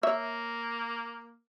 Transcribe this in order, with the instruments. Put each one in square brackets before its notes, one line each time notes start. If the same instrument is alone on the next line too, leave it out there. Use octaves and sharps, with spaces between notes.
[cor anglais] A#3 [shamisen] C#5 E5